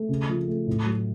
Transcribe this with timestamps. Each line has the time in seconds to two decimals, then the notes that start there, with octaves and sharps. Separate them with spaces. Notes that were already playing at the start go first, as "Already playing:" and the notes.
Already playing: A3
0.09 C#3
0.29 F3
0.47 A3
0.67 A2
0.86 F#3